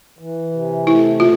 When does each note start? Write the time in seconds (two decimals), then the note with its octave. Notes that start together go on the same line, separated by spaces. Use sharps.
0.19 E3
0.53 C3
0.86 A3 E4
1.20 B2 F4